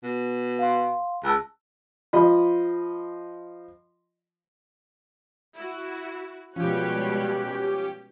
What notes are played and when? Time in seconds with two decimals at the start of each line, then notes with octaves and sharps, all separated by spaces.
0.04 B2
0.59 F5 C6
1.24 C#2 A5 E6 F#6
2.13 F3 D#5 B5
5.54 E4 F#4
6.56 B2 F3 G3 G#3 C#4 G4 C#5 F#6